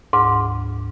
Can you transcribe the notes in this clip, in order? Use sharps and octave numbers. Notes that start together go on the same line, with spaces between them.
D2 G#2 D6